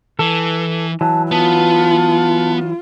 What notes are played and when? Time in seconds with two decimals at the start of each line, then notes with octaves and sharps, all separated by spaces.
0.19 E3 A4 B4
1.01 E3 F#3 A5
1.31 B3 F4 A5